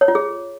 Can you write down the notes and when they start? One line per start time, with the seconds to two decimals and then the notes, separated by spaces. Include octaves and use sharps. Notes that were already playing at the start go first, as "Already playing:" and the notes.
0.01 C#5
0.08 F4
0.15 G#4